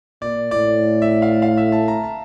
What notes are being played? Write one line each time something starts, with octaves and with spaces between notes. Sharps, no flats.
A#2 D5
A2 D5
E5
F5
F5
E5
A5
A#5
A5